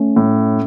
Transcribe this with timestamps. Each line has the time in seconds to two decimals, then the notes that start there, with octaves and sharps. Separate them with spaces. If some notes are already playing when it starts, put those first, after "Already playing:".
Already playing: A3 C#4
0.16 A2